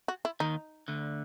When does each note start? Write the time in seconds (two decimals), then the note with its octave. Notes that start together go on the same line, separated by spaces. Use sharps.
0.08 F#4
0.25 E4
0.40 D#2 D#3 D#4
0.88 D2 D3